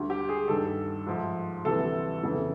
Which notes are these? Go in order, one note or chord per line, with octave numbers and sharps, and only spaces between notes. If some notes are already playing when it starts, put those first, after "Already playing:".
Already playing: D2 D3 G3
G4
G#4
G2 D#3 G3 A4
G#2 F3 A3
D2 C3 E3 G3 A4
F2 C#3 E3